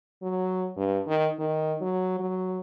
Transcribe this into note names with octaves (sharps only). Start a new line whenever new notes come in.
F#3
G2
D#3
D#3
F#3
F#3